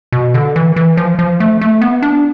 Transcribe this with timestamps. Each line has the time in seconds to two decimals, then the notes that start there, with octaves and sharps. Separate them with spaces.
0.12 B2
0.34 D3
0.56 E3
0.76 E3
0.97 F3
1.19 F3
1.40 A3
1.61 A3
1.82 B3
2.02 D4